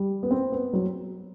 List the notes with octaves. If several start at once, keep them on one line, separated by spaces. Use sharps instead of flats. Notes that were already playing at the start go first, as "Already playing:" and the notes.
Already playing: G3
B3
C4
B3
F#3